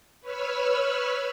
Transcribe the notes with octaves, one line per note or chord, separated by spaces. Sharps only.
B4 C#5 B5 E6 F6